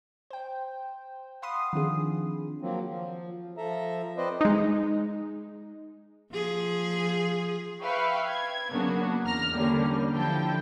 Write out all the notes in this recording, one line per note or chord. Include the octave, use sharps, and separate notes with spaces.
C5 G5
F5 F#5 B5 C6 D#6
D#3 F3 C4 D4 G#4
F3 F#3 A#3 C4
F3
F3 A4 E5 A#5
C4 B4 C5 D5 D#5
G#3 D#4
F3 G#4
B4 E5 F5 G5 B5 C#6
G#6
C#3 F#3 A#3 B3 D4 F#4
E2 A#5 F6 A#6
D3 G3 A#3 C#4
D3 F3 E4 G5 A5